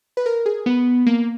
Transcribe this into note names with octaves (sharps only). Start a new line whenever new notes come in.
B4
A#4
G#4
B3
A#3